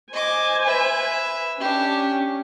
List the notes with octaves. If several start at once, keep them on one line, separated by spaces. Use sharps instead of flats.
C5 D#5 G#5 D6
B4 E5
C#4 D4 G4